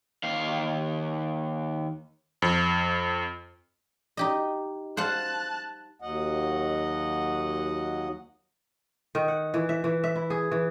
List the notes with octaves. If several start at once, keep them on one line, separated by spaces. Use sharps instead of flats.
D#2 F5
F2
D#4 G4 D#5
C5 F5 F#5 A5 F#6
D#2 F#3 D#5 F#5
D#3
F#5
E3
E5
E3
E5
E4
G#4
E3